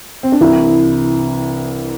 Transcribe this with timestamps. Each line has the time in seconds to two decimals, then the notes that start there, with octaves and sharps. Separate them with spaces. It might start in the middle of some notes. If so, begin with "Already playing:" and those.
0.23 C4
0.32 D4
0.41 C2 C3 E3 E4